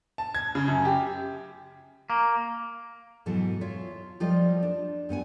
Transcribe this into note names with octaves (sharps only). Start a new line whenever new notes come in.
A5
G#6
C#3
F#2
G4
A#3
G#2 B2 E3 F#3 A4
F4 C#5 E5 F5
F3 G3 F4 A4 D5 D#5
D4
G2 B3 F#5 G#5